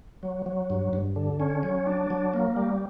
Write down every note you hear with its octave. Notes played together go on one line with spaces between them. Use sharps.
F#3
F#3
G2
G2
D3
C#4
F#3
D4
F#3
A#3
G3